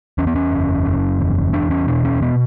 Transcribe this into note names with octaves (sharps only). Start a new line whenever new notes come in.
E2 C#4
B3
C#4
F#1
F#1
E2
E2 D4
C#4
B2 D4
C#4
B2 B3